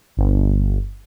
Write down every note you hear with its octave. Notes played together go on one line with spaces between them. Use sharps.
G1